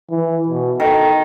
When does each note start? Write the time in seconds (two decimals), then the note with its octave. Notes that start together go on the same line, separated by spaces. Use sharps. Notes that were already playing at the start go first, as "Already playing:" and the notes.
0.11 E3
0.48 B2
0.80 D#3 A4